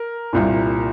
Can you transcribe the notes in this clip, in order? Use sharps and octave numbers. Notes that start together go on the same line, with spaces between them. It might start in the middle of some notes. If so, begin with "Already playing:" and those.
Already playing: A#4
C2 A#2